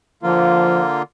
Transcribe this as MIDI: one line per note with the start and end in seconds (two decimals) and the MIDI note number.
0.23 1.02 50
0.23 0.81 53
0.23 1.02 58
0.23 1.02 65